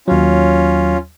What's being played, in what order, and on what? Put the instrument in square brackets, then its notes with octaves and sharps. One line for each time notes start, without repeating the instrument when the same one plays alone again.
[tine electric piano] D#2 F#3 [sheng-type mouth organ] C#4 F4